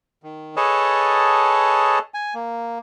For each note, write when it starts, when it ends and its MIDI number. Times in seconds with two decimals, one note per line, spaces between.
0.23 0.55 51
0.57 1.99 68
0.57 1.99 69
0.57 1.99 71
0.57 1.99 73
0.57 1.99 75
0.57 1.99 81
2.14 2.34 80
2.34 2.78 58